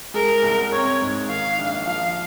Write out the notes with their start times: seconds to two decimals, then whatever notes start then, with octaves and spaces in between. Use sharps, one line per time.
0.14 G#3 A#4
0.43 C2
0.72 C4 C#5
1.01 G#2
1.29 D#3 F5
1.58 A#1
1.86 F3 F5